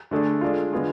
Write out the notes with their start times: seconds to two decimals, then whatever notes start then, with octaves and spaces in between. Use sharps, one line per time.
0.11 D3 A3 D4 G#4
0.41 G#3 D4 F4
0.72 D3 G#3 B3 F4 G#4